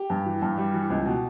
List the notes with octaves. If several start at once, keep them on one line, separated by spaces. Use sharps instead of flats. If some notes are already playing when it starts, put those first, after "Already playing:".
Already playing: G4
G2
E3
G2
G3
E3
C#2
B2